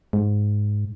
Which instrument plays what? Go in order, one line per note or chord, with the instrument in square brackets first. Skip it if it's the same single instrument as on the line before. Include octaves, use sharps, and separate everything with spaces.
[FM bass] G#2